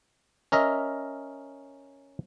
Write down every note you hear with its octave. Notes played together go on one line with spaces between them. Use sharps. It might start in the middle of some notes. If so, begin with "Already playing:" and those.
C#4 A#4 D#5 E5